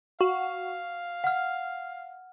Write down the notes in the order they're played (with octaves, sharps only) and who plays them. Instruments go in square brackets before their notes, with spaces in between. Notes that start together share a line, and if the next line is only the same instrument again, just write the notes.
[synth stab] F#4 [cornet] F5
[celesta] F#5 F6